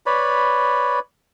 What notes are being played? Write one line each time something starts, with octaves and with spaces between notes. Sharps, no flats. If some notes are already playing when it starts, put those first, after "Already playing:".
B4 C#5 D5 B5